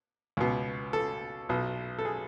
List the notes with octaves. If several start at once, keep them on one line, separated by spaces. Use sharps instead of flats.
C#2 B2
A4
B1 B2
A4
G#4